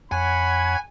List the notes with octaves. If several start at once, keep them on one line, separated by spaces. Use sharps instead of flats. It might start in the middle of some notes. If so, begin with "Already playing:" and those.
F2 C#5 F#5 G#5 B5